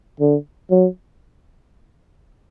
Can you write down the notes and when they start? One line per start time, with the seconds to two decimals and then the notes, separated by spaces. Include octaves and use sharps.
0.20 D3
0.71 F#3